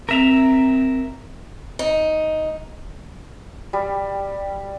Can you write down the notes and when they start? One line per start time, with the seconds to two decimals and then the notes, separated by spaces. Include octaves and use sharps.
0.09 C4 A#4 E5 A#5
1.79 D#4
3.73 G3